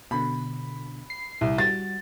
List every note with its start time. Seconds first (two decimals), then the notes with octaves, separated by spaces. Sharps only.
0.11 B2 D3 B5
1.10 C7
1.41 C2
1.58 G3 F#4 A6